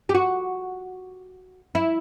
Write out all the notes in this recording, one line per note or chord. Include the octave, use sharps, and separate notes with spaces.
G4
F#4
E4